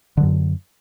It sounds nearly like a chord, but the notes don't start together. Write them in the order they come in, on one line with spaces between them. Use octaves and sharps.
D3 F#3 F#2